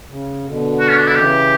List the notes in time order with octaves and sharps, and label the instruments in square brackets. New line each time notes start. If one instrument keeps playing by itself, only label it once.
[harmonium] C#3
B2 D3
[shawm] F#4
C#4
D4
E4
[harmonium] C#3 E3 [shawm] G4